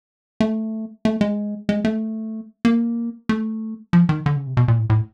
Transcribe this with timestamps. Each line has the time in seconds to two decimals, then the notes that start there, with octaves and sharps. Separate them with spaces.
0.40 A3
1.05 A3
1.21 G#3
1.69 G#3
1.85 A3
2.65 A#3
3.29 A3
3.93 F3
4.09 D#3
4.26 D3
4.36 C#3
4.47 C3
4.57 B2
4.68 A#2
4.79 A2
4.90 A2